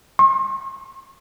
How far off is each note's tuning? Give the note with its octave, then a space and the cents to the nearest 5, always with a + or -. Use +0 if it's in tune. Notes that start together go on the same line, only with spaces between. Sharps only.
C6 +45